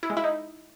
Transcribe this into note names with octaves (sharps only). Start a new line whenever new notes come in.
E4
G#3
E4
D#4